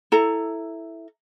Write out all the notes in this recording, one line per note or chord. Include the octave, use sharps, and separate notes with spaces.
E4 A4 A#5